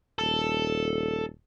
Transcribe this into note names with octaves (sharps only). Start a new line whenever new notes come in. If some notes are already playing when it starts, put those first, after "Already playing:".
D#1 A4